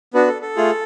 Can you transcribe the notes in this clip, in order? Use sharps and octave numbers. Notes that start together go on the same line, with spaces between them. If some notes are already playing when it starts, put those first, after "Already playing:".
B3 D4 F#4 B4
A4
A4
A3 F4 G#4